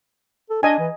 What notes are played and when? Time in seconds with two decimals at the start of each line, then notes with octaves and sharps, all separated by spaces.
0.50 A4
0.63 D4 D#5 G#5
0.80 E3